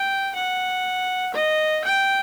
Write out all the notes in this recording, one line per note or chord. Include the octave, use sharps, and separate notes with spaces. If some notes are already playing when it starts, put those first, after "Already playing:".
Already playing: G5
F#5
D#5
G5